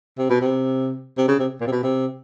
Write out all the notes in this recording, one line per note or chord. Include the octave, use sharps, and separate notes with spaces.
C3
B2
C3
C3
C#3
C3
A#2
C3
B2
C3